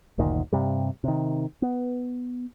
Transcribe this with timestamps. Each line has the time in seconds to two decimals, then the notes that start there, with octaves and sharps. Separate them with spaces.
0.18 F#1 D2 A#2 D#3
0.53 G2 C3 G3
1.04 C3 D#3
1.62 B3